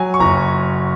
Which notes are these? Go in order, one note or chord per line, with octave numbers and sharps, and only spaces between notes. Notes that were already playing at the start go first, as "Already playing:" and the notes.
Already playing: F#3 G#5
C#6
F#1 A#5